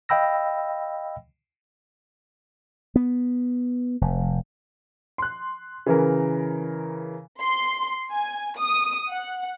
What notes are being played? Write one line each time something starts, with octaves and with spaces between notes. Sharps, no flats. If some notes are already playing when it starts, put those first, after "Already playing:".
D#5 F5 G5 B5 E6 A#6
B3
F1
C6 F#6
C#3 E3 A#4
C6
G#5
D#6
F#5